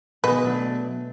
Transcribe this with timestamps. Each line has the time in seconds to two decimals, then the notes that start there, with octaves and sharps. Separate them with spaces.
0.24 B2 D#3 B3 G#4 B4
0.43 F#3 A3 D4